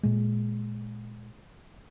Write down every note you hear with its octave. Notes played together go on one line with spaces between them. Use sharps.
A#2 G#3